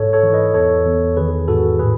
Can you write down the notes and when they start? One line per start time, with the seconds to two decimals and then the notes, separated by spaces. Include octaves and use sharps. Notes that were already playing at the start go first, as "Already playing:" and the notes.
Already playing: G#2 A4 C#5
0.13 A4 C#5
0.23 E3
0.33 B4 D#5
0.54 E2 A4 C#5
0.86 E2
1.17 D#3 G#4 B4
1.48 G#2 F#4 A4
1.79 A2 G#4 B4